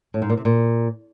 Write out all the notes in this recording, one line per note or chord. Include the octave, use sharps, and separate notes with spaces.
A2
G#2
A#2
C3
A#2